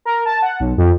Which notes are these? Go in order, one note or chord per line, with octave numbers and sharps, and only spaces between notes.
A#4
A5
F#5
B1
F2